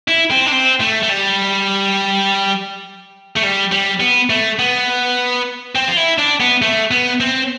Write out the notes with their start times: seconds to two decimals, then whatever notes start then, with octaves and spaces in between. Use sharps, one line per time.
0.08 E4
0.31 C4
0.47 D4
0.52 C4
0.81 A3
1.03 A3
1.10 G3
3.36 A3
3.43 G3
3.71 G3
4.00 B3
4.30 A3
4.59 B3
5.75 C4
5.88 F4
5.97 E4
6.18 D4
6.40 B3
6.62 A3
6.91 B3
7.20 C4